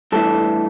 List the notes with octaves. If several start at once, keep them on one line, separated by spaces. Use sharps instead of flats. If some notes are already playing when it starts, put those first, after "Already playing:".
G2 E3 A3 A4